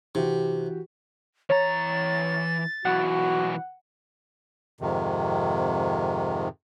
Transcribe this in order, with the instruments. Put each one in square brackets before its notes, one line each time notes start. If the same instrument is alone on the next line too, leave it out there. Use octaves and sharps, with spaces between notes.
[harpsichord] C3 [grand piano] E3 F#4 G4
[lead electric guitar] E3 A#5 [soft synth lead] C#5 [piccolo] A6
[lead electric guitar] B1 E3 [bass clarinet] F#4 [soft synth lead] F#5
[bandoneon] F2 G#2 C3 D#3